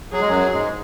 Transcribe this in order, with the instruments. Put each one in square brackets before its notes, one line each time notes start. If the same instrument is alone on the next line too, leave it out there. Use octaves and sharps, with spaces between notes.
[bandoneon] F#3 [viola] G#4
[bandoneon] G#3
F#2 F#3
G#2 G#3